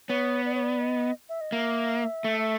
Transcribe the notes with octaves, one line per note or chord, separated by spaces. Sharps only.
B3 C#5
D5
C#5
D5
D#5
E5
D#5
A#3 E5
A3